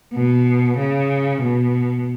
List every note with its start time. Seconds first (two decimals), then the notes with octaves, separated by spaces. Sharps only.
0.14 B2
0.78 C#3
1.42 B2